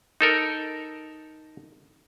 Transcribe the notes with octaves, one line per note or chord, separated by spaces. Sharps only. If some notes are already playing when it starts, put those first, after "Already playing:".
D#4 A4 A#4